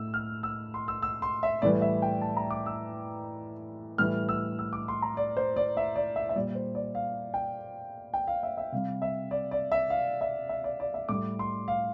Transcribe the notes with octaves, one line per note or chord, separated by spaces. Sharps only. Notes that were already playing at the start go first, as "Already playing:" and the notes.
Already playing: A2 E6
F6
E6
C6
E6
E6
C6
E5
A2 E3 G3 D5
E5
G5
A5
A#5
D6
E6
A2 E3 G3 F6
E6
E6
D6
C6
A#5
D5
C5
D5
E5
D5
E5
E5
A#2 G3 D5
C5
D5
F5
G5
G5
F5
E5
E5
C3 G3 F5
E5
D5
D5
E5
F5
E5
E5
D5
D5
E5
A2 G3 D6
C6
F5